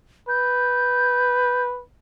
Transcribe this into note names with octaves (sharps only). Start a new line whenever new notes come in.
B4 G6